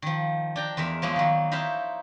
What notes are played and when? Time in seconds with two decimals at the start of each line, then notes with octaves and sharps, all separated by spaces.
0.02 D#3 F3
0.56 D4 G5 A#5
0.77 E2 G#3 A#4 E5
1.02 F3 F#3 G#3 A#3 B3
1.16 D#3 F#3
1.52 D#4 E4 C5 E5 F5